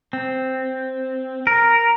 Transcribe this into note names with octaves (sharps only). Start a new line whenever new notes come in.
C4
A#4